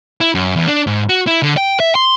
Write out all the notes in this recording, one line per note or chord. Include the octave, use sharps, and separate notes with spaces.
E4
F#2
E2
D4
G#2
F#4
E4
D3
G5
E5
C6